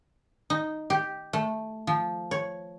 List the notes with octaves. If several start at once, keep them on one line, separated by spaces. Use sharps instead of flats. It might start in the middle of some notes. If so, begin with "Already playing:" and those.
D#4
G4
A3
F3
C#5